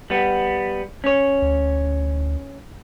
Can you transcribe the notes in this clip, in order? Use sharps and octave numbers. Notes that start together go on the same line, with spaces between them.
G3 B3
C#4 C#5
D2